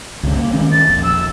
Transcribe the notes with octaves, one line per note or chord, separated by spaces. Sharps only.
C#2 G2 C#3
A#3
D#3 G#3 C#4
A6
E1 A#1
E6